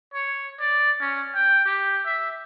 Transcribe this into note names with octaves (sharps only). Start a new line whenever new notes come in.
C#5
D5
C#4
G5
G4
E5